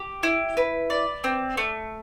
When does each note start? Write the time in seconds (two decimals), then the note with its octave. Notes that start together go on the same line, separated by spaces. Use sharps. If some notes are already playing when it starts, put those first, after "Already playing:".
Already playing: G4
0.23 E4
0.57 B4
0.90 D5
1.24 C4
1.57 A3